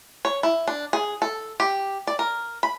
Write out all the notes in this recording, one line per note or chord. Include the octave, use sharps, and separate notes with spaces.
C#5
E4
D4
G#4
A4
G4
D5
A#4
B5